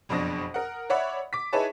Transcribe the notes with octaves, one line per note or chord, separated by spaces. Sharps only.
F#1 F2 B2 D4 D#6 A#6
A#4 F#5
C#5 D5 E5 F#5 B5
D6 B6
D#4 E4 G#4 B4 C#5 A5